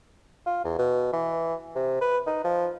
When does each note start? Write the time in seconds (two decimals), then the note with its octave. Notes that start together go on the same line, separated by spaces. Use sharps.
0.46 F4
0.65 E2
0.79 B2
1.13 E3
1.76 C3
2.01 B4
2.27 D#4
2.45 F3